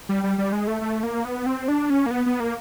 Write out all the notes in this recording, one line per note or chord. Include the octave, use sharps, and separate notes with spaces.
G3
G3
G3
G#3
A3
A3
A#3
B3
C4
D4
C#4
A#3
B3
B3
A#3